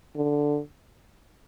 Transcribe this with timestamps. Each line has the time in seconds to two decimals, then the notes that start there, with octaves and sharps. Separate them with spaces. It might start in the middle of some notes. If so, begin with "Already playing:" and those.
0.16 D3